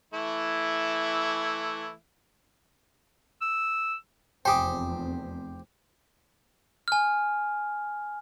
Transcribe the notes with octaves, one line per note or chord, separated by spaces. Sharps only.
E3 A3 E4
E6
F1 E2 C4 G4 C5 G5 G#5 D#6
G#5 F6